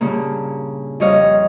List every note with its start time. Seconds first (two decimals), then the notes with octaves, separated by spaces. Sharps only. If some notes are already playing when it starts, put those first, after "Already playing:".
0.01 G2 A#2 C#3 A#3
1.00 F2 G3 C#5 D#5 F5